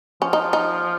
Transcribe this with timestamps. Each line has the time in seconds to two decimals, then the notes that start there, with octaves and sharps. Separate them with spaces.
0.22 F3 C#4
0.33 D#4
0.53 D#4